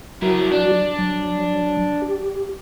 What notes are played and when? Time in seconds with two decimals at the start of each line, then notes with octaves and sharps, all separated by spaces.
0.22 F#3 E4 F#4 A#4
0.51 D4
0.99 F#3
2.02 G4